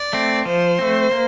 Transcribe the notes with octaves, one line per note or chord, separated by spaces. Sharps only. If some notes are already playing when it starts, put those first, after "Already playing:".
Already playing: D5
A3 C4
F3 C5
A3 C4
A#3